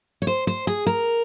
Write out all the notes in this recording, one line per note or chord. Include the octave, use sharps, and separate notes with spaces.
C#5
C5
C5
G#4
A#4